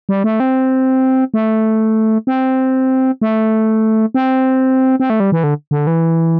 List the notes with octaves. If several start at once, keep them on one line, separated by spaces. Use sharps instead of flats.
G3
A3
C4
A3
C4
A3
C4
C4
A3
G3
E3
D3
D3
E3